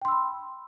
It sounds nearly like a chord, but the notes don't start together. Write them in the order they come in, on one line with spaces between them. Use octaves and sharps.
G5 C6 E6 B5